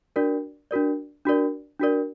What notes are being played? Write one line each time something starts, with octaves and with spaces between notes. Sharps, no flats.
D4 F#4 A#4 D5
D4 F#4 A#4 D5
D4 F#4 A#4 D5
D4 F#4 A#4 D5